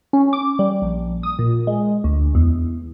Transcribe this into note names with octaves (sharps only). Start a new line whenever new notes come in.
C#4
D6
G3
A#1
D#6
A#2
G#3
D2
E2